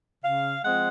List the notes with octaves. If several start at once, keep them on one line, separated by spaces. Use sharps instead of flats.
C#3 F5
F3 G#3 C4 F#5